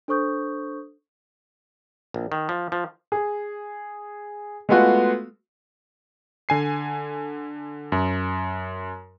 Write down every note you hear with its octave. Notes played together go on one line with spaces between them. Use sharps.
D4 A4 C5 C#6 D#6 G6
A#1
D#3
F3
F3
G#4
G#3 A3 B3 F4 F#4
D3 G#5 C7
F#2